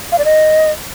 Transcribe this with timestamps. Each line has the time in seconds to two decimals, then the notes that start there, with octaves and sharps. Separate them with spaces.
0.12 F5
0.18 D5
0.25 D#5